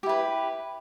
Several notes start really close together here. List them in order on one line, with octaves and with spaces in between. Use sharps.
G4 E4 B4